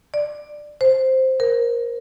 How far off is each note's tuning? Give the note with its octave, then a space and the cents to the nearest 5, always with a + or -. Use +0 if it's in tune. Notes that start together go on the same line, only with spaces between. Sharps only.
D5 +10
C5 +0
A#4 +15